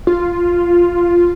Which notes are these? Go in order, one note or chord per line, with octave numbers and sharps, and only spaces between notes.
F4